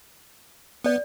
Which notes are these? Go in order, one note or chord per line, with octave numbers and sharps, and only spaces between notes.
B3 D5